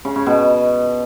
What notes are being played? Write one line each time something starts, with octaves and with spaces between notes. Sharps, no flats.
C#3
C#3
B2